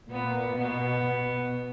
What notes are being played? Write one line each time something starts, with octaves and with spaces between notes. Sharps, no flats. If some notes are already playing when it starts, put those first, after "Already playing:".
A#2 B3
B2 B3
B2